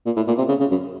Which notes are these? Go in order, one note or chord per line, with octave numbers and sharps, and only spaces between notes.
A#2
A2
A#2
C3
C#3
C#3
F#2